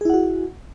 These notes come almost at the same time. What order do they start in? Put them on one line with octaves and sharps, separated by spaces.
G#4 E4 F#5 F#4